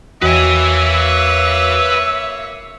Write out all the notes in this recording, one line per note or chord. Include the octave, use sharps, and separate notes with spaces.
E2 A#3 F#4 B4 C#5 E5 G#5